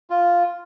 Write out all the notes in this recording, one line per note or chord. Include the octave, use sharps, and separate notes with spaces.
F4